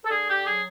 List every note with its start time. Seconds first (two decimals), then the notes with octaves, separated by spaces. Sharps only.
0.05 A4
0.11 D3 G#4
0.29 G4
0.45 F#3 G#4